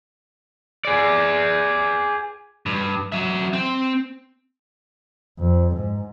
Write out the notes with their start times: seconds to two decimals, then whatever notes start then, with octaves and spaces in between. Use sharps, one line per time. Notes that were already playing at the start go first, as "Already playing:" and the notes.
0.85 G#4 D5
2.66 G2
3.12 F#3 E5
3.53 C4
5.39 F2
5.76 G#2